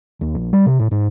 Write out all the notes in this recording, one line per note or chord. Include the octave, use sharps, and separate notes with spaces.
D#2
A#1
G3
C3
A2
G#2